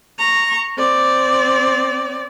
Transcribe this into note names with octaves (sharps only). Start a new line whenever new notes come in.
A#5 C#6
C4 D5